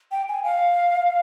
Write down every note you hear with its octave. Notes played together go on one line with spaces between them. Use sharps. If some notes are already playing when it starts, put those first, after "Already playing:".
G5
G#5
F5